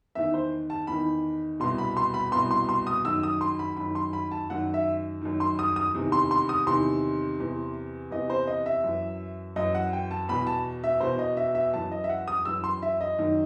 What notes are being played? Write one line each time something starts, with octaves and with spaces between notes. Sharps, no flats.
E2 D#3 E5
C5
A5
E2 D#3 B5
C2 B2 C6
B5
C6
B5
C2 B2 C6
C6
C6
D#6
F#2 D#3 E6
D#6
C6
B5
F#2 D#3 B5
C6
B5
A5
F#2 D#3 F#5
E5
F#2 D#3
C6
D#6
D#6
E2 C3 D#3
C6
C6
D#6
E2 C3 D#3 C6
E2 C3 E3
E2 C3 E3 D#5
C5
D#5
E5
F#2 E3
F#2 E3 D#5
F#5
G5
A5
E2 B2 B5
A5
E5
E2 B2 C5
D#5
E5
E5
F#2 E3 A5
D#5
E5
F#5
D#6
F#2 E3 E6
C6
E5
D#5
F#2 D#3